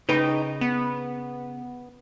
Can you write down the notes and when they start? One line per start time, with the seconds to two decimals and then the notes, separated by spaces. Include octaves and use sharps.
0.09 C#3 D#4 B4 G5
0.61 B3